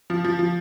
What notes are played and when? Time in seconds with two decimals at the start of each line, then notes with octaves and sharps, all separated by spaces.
0.10 F3
0.24 F3
0.39 F3